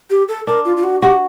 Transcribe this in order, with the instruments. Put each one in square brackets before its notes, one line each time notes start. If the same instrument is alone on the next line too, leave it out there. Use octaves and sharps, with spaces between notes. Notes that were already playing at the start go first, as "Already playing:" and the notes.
[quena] G4
A4
[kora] D4 [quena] A#4
[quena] F4
F4
F#4
[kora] F#4 [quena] G4